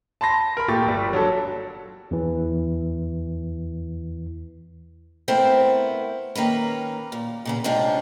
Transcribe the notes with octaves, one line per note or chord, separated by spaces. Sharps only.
A5 B5 C6 A#6
A#4 B5
A#2 A3 G4 C#6 A6
G1 G3
F#3 D4 A4
E2 E3
A3 B3 C4 E4 A#4 C5
D#3 A#3 C#4 B4
A#2
A#2 C#3 B3
G#2 C3 C#4 D4 F4